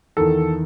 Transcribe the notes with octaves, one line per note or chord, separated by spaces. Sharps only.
E2 D#3 A4